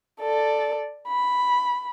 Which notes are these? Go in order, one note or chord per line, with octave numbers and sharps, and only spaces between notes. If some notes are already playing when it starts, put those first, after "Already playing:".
A4 D5
B5